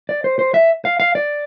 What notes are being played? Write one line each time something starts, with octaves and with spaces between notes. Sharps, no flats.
D5
C5
C5
E5
F5
F5
D5